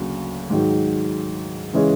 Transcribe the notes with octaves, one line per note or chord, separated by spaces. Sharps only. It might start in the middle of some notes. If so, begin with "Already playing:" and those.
Already playing: D2 C#3 F#3 A#3
G#2 D#3 F#3
C#3 E3 G#3 C#4